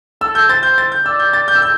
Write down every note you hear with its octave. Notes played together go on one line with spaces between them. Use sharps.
A4 E6
A4 G6
C5 A6
G6
A6
G6
D5 E6
G6
A6
G6
E6
G6